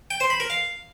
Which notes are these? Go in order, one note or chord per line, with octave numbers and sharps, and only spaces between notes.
G5
C5
B5
A#4
F5